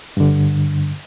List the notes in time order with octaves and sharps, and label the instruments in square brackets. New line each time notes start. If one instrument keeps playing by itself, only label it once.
[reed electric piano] G2 D3